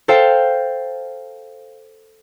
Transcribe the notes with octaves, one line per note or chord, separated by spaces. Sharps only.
A4 C5 F5 G5